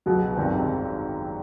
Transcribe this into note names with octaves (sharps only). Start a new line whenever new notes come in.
C#2 B2 F#3 B3
G#1 F#2 D#3 G3 C4